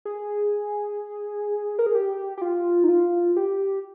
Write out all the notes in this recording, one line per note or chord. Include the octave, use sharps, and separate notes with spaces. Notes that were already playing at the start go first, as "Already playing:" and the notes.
G#4
A#4
G#4
G4
G4
F4
D#4
F4
G4